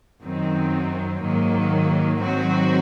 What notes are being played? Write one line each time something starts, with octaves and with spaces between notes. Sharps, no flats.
F#2 D#3 F#3 C4 D#4
G#2 D#3 F#3 A#3
G#2 D#3 F#3 C4 F#4